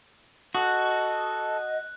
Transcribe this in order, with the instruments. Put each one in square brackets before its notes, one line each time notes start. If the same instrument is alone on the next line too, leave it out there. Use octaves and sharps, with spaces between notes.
[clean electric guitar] F#4 [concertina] A4 [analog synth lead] D#5 [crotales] F#6